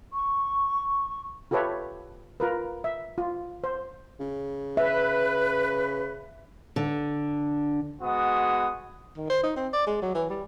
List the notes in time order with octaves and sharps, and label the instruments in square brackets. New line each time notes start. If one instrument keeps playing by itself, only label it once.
[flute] C#6
[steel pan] F4 G4 A4 B4 C#5 E5
F4 A#4 B4
E5
F4
C5
[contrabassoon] C#3
[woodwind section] B4 [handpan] E5
[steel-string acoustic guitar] D3
[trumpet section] G#3 B3 F#4 D#6
[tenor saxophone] D#3
C5
D#4
C4
D5
G#3
F#3
E3
G3